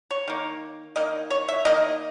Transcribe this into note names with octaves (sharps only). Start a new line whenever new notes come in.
C#5
D#3 A#3
D#3 A#3 D#5
C#5
E5
D#3 A#3 D#5